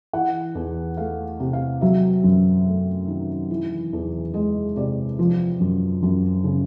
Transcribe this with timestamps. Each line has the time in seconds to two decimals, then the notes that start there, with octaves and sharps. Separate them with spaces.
0.13 E3 F#5
0.55 E2
0.97 A3 F5
1.40 C3
1.53 F5
1.81 F#3 E5
2.23 F#2
2.66 A3
3.08 D#3
3.51 E3
3.93 E2
4.34 G#3 D#5
4.76 C3 D5
5.19 F3
5.60 F#2
6.02 F#2
6.44 C#3